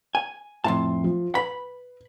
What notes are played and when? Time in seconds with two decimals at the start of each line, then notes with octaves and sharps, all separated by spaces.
0.15 G#5
0.64 F2 A2 E5 A5 C6
1.04 F3
1.35 B4 B5